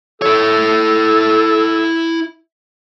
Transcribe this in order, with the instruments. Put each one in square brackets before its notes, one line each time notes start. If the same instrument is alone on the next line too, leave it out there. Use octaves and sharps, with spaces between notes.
[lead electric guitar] E4 C#5 [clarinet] A4